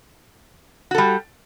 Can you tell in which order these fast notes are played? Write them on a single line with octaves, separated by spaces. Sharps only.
F#4 A4 G3